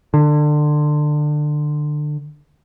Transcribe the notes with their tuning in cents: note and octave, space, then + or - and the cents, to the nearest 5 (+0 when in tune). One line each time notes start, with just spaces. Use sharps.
D3 +25